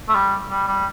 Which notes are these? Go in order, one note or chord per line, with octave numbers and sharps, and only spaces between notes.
A3
G3
G3
G3